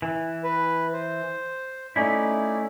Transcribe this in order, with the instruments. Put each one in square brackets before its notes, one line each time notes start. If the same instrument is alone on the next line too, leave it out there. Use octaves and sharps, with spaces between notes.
[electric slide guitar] E3
[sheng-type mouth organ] B4
C5
[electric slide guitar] A3 C#4 E4 [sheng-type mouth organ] D#4 D5